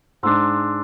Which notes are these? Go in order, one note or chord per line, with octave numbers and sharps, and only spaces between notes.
G#2 G#3 D4 C6 E6